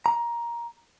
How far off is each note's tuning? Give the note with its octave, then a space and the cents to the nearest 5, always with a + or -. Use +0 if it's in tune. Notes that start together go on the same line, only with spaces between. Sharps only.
A#5 +15